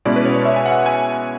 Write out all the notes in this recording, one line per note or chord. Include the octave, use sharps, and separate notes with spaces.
B2 G#3 C#4 E4 D5
B4
C#5
E5
G#5
F#5
G#5